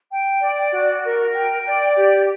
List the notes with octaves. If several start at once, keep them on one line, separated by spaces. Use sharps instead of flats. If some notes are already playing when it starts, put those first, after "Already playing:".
G5
D5
F#4
A#4
G5
D5
G4